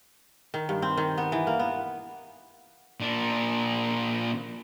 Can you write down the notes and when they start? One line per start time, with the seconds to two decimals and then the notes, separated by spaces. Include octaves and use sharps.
0.54 D#3
0.69 G2
0.82 C4
0.97 D#3
1.18 B3
1.32 E3
1.47 A#3
1.59 B3
3.00 A#2 D4